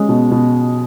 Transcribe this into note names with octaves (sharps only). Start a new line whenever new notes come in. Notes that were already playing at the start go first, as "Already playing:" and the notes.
Already playing: G#3 C#4
B2
B2